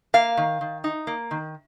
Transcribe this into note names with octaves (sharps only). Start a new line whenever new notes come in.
A#3 F5
D#3
D#3
D#4
A#3
D#3